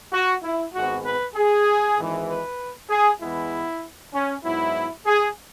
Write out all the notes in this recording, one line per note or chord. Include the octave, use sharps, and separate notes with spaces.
F#4
E4
G#1 G#2 G#3 B3 F#4
B4
G#4
G#1 G#2 E3 G#3
B4
G#4
E2 E3 G#3 B3 E4
C#4
G#2 F#3 B3 E4
G#4